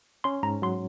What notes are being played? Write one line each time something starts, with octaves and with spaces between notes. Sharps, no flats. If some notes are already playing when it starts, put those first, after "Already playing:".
C#4 C6
G#2 A#5
F#3 C6